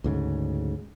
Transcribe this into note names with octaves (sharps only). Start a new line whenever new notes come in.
D2 G#2 C#3